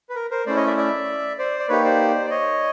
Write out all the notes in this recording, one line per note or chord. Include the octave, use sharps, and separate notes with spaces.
B4
A#4
A#4 C5
A3 C#4 E4 C5 D5
C#5 D#5
D5 E5
D5 E5
C5 D5
D5
A#3 D#4 G4 B4 C#5
C5 D5
D5
C#5 D#5